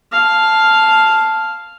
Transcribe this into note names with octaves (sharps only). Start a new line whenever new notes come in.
F5 A5